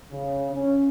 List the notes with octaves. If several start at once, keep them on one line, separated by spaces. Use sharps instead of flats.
C#3
C#4